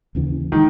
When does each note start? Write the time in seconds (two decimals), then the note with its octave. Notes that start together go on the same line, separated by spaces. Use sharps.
0.15 D#2 C#3 E3
0.52 D#3 E3 G#3